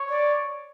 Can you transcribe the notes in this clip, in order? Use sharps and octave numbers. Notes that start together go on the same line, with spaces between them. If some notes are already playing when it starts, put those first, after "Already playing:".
Already playing: C#5
D5